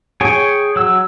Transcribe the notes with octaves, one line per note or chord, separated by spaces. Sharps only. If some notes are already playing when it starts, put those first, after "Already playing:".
G#4 C#5 G5 G#5
F#3 E6